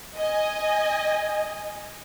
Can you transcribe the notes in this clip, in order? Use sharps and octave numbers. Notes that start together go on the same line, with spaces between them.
D#5 G#5